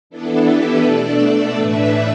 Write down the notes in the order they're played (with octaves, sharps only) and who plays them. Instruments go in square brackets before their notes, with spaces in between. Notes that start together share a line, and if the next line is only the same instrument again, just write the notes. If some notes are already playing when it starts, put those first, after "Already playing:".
[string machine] E3 B3 D4 E4 A4
G4 B4
B2 A3 D4 A4 D5
A2 E3 A3 D4 B4 E5